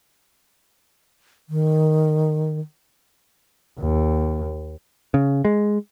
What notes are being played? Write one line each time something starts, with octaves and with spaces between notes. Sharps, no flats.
D#3
D#2
C#3
G#3